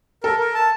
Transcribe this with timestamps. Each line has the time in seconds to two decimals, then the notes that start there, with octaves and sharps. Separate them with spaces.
0.23 A4 A#4
0.39 A#4
0.55 A5